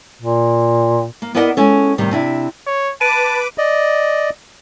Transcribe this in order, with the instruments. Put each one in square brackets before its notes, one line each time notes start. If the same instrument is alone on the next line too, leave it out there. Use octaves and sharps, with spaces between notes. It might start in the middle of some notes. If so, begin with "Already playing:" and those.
[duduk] A#2
[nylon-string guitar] A#3
B3 E4 A#4 D5 D#5 F#5
G#3 C#4 A4
A2 C3 D#3 G3
C3 D4 E4
[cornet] C#5
[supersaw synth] B4 D6 [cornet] A5 [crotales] D7 D#7
[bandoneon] D5 D#5